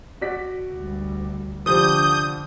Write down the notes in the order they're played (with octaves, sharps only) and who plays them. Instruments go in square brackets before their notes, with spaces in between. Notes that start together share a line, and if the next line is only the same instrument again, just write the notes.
[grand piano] F#4 D5 B6
[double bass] D2 G3
[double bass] D3 D4 [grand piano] F3 G3 [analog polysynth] D#6 G6